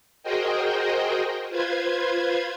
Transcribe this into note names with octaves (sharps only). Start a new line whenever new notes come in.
F#4 G#4 A#4 C5 D#5 G5
F4 B4 C5 G#6